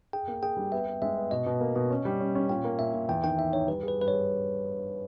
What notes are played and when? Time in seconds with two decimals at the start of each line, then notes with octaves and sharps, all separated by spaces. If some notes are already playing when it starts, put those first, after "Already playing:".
0.13 G#4 G5
0.28 A#3
0.42 G#4 G5
0.57 G3
0.72 B3 E5
0.87 B3
1.02 G#3 E5
1.17 B3
1.31 B2 D#5
1.46 B2
1.61 A#3
1.76 B2
1.90 C#4
2.05 G3
2.20 C#4
2.35 C#4
2.49 A#2 G5
2.64 A#3
2.79 A#2 E5
2.94 A#2
3.09 E2 G5
3.24 D#3 G5
3.38 E2 E5
3.53 D#4 C#5
3.68 G3 B4
3.83 G#4
3.88 B4
3.98 G2 B4
4.08 G#4 C#5